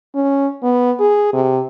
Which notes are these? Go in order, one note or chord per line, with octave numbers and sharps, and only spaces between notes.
C#4
B3
G#4
C3